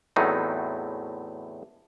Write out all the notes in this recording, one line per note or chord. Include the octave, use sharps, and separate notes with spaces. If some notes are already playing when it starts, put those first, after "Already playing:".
E2 A2 F#3 A3 C4 D#4